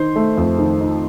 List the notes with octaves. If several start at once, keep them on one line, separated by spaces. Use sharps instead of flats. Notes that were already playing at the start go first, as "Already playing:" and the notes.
Already playing: D#3 D#4 C5
A3
F2
D#3
D#4